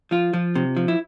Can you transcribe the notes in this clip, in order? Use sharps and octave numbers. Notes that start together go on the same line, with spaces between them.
F3 F4
F3
C3
F3
E4